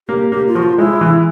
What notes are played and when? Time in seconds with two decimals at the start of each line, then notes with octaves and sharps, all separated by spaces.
0.08 A#3 G4
0.32 A#3 G4
0.47 F4
0.55 F3 F#4
0.63 F4
0.78 G#3 E4
1.01 E3